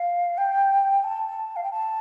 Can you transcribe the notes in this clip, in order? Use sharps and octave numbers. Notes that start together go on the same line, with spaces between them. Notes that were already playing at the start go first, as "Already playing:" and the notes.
Already playing: F5
G5
A5
F5
G5
A5